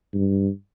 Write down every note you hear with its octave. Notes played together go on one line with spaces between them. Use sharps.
G2